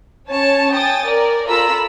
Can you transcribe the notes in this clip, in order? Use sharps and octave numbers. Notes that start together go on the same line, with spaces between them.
C#4 C#5 A5
G5 G#5 D#6 A6
A#4 D5
F4 A4 A#4 A#5 B5 E6